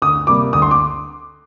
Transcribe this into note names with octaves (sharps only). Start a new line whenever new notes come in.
D2 D#6
C3 G3 A#3 D6
D2 D#6
C6
D6